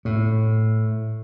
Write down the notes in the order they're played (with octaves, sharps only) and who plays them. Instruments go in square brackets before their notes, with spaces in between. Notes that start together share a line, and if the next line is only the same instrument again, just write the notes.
[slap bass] A2